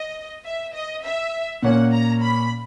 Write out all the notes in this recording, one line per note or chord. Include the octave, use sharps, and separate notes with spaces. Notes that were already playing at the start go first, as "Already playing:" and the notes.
Already playing: D#5
E5
D#5
E5
A#2 A#3 C#4 F#5
A#5
B5